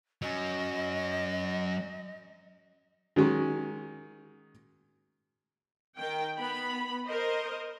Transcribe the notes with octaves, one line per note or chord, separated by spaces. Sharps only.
F#3 C#4 D#5
D#3 F#3 G#3 C#4
D#3 G5
B3 B5
A#4 C5 D#5